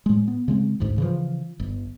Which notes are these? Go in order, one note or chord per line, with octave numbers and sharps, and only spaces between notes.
A2 G#3
B3
C#3 G#3 C4
A1 D2 G#2
C#3 E3 F3
G1